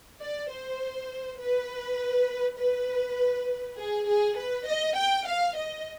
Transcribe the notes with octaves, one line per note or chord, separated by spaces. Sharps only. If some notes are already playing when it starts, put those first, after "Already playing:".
D5
C5
B4
B4
G#4
G#4
B4
D#5
G5
F5
D#5